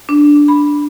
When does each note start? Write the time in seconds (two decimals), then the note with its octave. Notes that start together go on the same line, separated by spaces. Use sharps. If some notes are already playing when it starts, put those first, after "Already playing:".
0.09 D4
0.48 B5